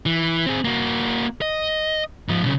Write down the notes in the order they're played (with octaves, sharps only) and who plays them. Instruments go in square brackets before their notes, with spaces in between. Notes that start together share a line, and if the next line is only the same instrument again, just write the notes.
[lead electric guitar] E3
C4 G#4
A#3 F#4
D#5
G#2 F3
B1 C#3